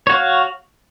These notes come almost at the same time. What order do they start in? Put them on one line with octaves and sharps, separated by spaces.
C#5 F#4 F5